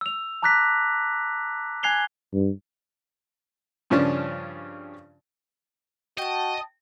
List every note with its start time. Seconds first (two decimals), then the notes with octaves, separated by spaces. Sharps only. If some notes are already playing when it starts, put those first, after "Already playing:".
0.01 E6 F7
0.42 A5 A#5 D6 F#6 A#6 B6
1.83 G#5 F#6 G#6 C7 F7 G7
2.34 G2
3.90 G2 C#3 F3 C#4 D4
6.18 F#4 D#5 G5 A5